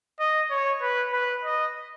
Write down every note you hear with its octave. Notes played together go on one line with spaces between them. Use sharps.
D#5
C#5
B4
B4
D#5